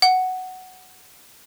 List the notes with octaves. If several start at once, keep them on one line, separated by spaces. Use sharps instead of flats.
F#5